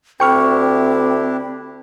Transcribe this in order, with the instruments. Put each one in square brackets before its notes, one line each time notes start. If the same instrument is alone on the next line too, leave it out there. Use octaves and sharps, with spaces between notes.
[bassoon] D2 [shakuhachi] C4 [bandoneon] D4 E4 G4 [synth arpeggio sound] G5 C#6 F6